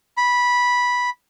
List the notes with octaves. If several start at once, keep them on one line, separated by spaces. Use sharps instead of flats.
B5